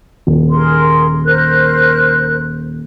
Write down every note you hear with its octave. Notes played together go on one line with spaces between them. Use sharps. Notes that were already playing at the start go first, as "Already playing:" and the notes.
D#1
G#4 A#4 C6
A#4 C5 F#6